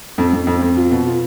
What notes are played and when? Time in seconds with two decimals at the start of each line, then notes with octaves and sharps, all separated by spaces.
0.18 F2
0.33 F2
0.47 F2
0.62 F2
0.77 F4
0.91 B2
1.06 F4